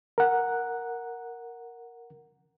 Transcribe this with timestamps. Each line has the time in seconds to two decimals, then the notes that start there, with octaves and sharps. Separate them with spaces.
0.18 A#4 F#5